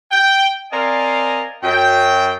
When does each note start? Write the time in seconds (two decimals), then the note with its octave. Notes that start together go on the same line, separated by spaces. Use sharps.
0.11 G5
0.72 C4 A#4 D5 D#5 F5 G#5
1.63 F#2 G5